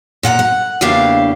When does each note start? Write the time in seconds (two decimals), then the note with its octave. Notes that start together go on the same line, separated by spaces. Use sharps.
0.23 A#2 F#5 G#5 A#5
0.39 F#5
0.81 E2 C#3 A#3 D4 G4 F5